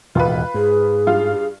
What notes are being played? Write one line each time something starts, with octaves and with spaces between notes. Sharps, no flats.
E1 D#2 A2 F4 B4
G#2 G#4
G2 F4 F5